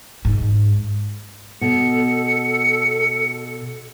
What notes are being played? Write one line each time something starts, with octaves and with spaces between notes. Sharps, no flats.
G#2
B2 A4 C#7